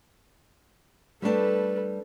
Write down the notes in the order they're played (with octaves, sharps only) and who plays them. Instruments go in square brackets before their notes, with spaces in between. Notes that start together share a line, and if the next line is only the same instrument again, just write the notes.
[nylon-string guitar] G3 A3 D4 [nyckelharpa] A4 B4